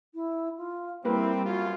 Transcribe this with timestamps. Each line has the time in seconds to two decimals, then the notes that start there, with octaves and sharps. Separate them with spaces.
0.14 E4
0.57 F4
1.05 G3 A#3 C4 E4 A#4 B4
1.45 F#2 F4 F#4